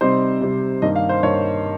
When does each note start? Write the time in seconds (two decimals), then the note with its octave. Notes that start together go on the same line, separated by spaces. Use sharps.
0.01 C3 G3 C4 D#4 C5
0.41 C3 G3 C4 D#4
0.82 G2 D#3 A#3 D#4 D#5
0.96 F5
1.09 C5
1.23 G2 D#3 A#3 D#4 C#5